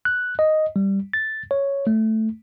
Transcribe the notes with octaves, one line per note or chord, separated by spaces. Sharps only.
F#6
D#5
G3
A6
C#5
A3